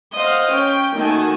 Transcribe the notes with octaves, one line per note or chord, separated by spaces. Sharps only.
C5 D#5 F5 F#5
C#4 G5
D#3 A3 A#3 F#4 G#5 A5